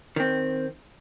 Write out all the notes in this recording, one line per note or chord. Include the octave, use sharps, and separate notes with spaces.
D#3 C4